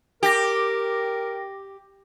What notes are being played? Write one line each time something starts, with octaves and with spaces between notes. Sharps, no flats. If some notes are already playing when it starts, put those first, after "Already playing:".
G4 A#4 G5 A#6